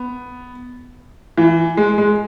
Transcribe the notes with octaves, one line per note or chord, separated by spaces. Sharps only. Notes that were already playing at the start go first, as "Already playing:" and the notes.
Already playing: B3
E3
G#3
G#3